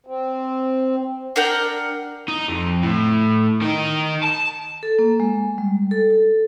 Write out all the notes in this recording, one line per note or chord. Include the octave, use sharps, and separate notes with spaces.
C4
D4 A#4 F#5 G5
D#4
F2
A2
D#3 D#4
A5
A4
A#3
G#3
G3
A4
A4